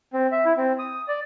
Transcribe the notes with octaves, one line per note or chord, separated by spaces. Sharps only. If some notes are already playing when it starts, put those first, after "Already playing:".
C4
E5
E4
C4
D#6
D5